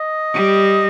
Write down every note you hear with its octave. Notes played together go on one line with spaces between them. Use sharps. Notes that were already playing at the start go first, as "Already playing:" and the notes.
Already playing: D#5
G3